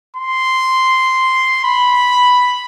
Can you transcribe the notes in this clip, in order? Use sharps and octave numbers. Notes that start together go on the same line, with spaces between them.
C6
B5